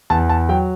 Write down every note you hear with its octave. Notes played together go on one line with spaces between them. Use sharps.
E2 A5
A5
F#3 G5